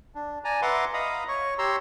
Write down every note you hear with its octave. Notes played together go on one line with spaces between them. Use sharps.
D4
D5 G#5 A#5
B4 E5 F#5 A#5 C6 D6
D#5 F5 A#5 B5 D#6
C#5 C#6
G4 C#5 A#5 C6 E6